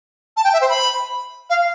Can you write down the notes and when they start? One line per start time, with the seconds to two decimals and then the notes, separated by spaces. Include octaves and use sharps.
0.37 A5
0.44 G5
0.53 E5
0.61 C5
0.69 B5
1.50 F5